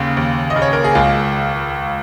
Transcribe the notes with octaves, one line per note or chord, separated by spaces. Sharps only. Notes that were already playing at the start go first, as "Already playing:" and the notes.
Already playing: D#2 C#3
D#2
D#5
C#3
C#5
A#4
G#4
C#2 F4